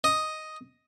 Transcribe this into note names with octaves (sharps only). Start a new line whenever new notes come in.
D#5